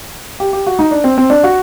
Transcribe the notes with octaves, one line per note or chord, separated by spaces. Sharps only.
G4
G4
F#4
D#4
D4
C4
C4
D4
F#4